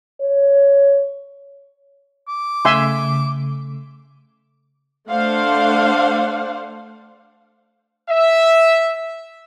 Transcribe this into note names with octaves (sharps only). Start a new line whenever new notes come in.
C#5
D6
C#3 A3 E5 G#5 C6
A3 D4 C5 F5 F#5
E5